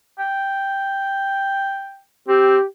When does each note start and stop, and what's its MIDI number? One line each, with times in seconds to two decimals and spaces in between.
0.19 2.01 79
2.28 2.57 60
2.28 2.64 67